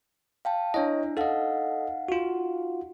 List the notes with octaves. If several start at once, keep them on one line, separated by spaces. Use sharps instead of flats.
F5 G5 A5
D4 E4 C#5 D#5
D#4 A4 D#5 F5 F#5
F4 F#4